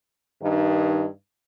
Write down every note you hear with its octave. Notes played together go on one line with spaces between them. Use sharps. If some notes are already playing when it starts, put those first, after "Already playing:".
G2 D#3 D#4